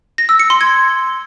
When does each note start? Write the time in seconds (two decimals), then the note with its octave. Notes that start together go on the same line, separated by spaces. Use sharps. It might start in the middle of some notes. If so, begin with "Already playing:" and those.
0.18 A#6
0.29 E6
0.39 C#7
0.50 C6
0.61 G#6